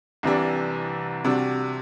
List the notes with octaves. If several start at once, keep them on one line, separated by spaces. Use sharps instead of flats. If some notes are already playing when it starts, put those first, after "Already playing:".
C2 C3 E3 G3 D4
C3 G3 D4 F#4